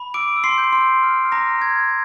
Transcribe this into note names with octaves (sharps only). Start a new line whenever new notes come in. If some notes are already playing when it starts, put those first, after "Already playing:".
Already playing: B5
D6 E6 D7
E6
C6 C7
G6
C6 C7
E6
F6
F6
A#5 A#6
F6
G#6
F6